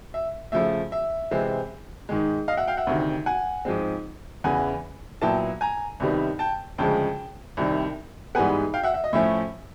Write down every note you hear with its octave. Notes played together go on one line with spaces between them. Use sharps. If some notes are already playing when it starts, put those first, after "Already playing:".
E5
C#3 F3 A3 E5
E5
C3 E3 G#3 C4
G#2 D#3 G#3
D#5 F5
E5 F#5
F5 G5
E5 F#5
D2 C3 D#3
F#5 G#5
G#2 F3 G#3 C4
E2 C#3 E3 F#5 G#5
A#2 F#3 B3 E4 G5 A5
G#5 A#5
C2 C3 D#3 G3 B3
G5 A5
D2 C#3 F3 G#3 G5 A5
C2 C3 D#3 G3
G#2 E3 G3 B3 F#5 G#5
F5 G5
E5 F#5
E5
D#5
A2 F3 A3 C#4 E4 E5